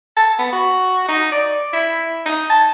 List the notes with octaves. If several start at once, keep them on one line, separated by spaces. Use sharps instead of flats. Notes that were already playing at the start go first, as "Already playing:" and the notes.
A5
B3
F#4
D#4
D5
E4
D#4
A5